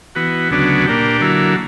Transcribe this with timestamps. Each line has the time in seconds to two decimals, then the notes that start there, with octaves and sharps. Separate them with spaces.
0.15 E3 B3 F#4
0.51 D2 C#3 F#3 B3 D4
0.86 A#2 A#3 D4 G4
1.21 D3 F#3 A#3 E4